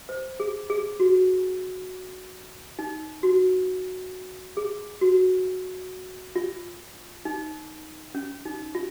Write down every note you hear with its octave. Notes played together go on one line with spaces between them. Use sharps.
C5
G#4
G#4
F#4
D#4
F#4
G#4
F#4
F4
D#4
C#4
D#4
F4